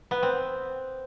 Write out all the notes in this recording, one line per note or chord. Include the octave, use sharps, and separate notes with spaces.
B3
C4